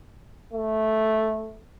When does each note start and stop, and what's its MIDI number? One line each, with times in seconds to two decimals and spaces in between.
0.53 1.59 57